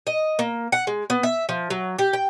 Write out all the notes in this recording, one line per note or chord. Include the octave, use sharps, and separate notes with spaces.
D#5
A#3
F#5
G#3
B3
E5
F3
F#3
G4
G5